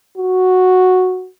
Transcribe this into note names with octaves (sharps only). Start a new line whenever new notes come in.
F#4